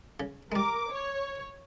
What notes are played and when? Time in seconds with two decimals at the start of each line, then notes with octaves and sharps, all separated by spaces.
0.20 C#3
0.52 G3 G#3 A#4 D6
0.91 C#5